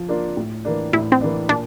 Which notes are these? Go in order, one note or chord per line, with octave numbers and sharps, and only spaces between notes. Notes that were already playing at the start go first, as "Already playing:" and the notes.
Already playing: F3
A#3 D4 F4
A2
E3 A#3 D4
A2 E4
C4
E3 A#3 D4
A#2 D4